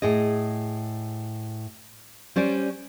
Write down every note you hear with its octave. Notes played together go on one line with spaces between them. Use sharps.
A2 G#4 D#5
G3 C#4 C5 D5